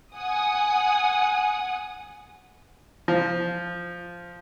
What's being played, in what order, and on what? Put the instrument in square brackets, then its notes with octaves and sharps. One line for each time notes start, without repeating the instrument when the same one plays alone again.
[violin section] F#5 G#5 D#6
[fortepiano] F3